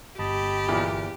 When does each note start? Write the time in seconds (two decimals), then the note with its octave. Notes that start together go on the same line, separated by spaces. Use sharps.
0.19 G1 G4 D#5 A5 B5
0.68 E2 A#2